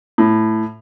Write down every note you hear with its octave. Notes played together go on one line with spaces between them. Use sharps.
A2